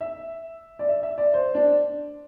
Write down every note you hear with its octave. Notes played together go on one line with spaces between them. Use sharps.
E5
D5
E5
E5
D5
C5
D4